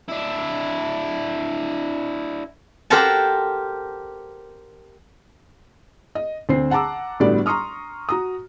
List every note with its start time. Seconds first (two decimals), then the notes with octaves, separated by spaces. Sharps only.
0.08 D4 E4
2.90 G4 A4 A#4 C5 F#5 A5
6.15 D#5
6.49 D2 C4 C5 C7
6.71 F#5 A5 A#5 D6 E6
7.20 G1 A2 G3 B3 F#4 D5
7.46 A#5 C6 C#6 D#6 F6
8.09 F#4 A#5 D#6